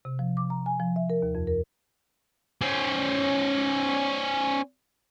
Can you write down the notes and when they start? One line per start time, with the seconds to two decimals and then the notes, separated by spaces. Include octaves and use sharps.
0.05 C3
0.19 F3
0.37 D6
0.50 A#5
0.66 G#5
0.80 F3
0.96 E5
1.10 A#4
1.22 D#2
1.35 F2
1.47 A#4
2.61 C#4 C5